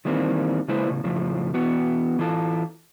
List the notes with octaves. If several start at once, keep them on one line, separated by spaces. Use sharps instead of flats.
D#3 E3 G3 A#3 C4
C#3 G#3 A#3 E4 B4 C5
A2 C#3
F2 A2 C#3 F3
E3 B3 F#4
E3 F4 A4